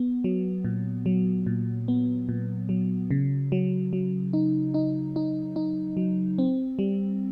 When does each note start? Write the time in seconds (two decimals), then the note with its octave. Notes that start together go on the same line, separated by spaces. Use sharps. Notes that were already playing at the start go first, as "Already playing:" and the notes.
Already playing: B3
0.24 F#3
0.64 A#2
1.06 F#3
1.46 A#2
1.88 B3
2.29 A#2
2.69 F#3
3.11 C#3
3.52 F#3
3.93 F#3
4.33 D#4
4.74 D#4
5.16 D#4
5.56 D#4
5.97 F#3
6.38 C4
6.79 G3